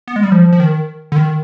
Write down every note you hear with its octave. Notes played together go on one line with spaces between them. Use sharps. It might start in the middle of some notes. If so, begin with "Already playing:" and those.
B3
G#3
G3
F3
F3
D#3
D3
D#3